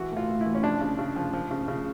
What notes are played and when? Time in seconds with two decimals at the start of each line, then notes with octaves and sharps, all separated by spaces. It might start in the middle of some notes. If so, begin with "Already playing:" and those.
Already playing: E3 F#4
0.12 A2
0.17 F4
0.29 A2
0.41 E3 E4
0.55 C#4
0.63 F3 D4
0.81 C#3
0.99 C#3
1.16 F3
1.33 F3
1.51 C#3
1.68 C#3